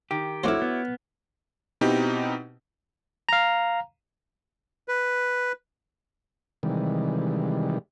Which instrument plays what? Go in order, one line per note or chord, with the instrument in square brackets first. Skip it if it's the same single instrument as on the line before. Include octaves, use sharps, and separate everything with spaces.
[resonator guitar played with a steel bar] D#3 [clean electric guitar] G4
[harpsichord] F2 A3 C5 [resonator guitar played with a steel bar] E4 F#4 [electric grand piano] C#5 D6 F6
[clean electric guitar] B3
[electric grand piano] B2 C4 D#4 E4 G4
[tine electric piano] F5 A#5
[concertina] B4
[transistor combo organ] C3 D#3 E3 G3 G#3